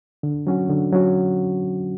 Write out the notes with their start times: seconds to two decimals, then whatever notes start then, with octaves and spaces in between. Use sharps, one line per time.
0.23 D3
0.47 F#3 C#4 F#4
0.69 D3
0.93 F#3 C#4 F#4